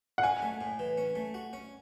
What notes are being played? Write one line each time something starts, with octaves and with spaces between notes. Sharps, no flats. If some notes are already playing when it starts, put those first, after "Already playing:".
F#5
C#4 G#5
A3
A2
E3
C#4
A3
F#4
C#4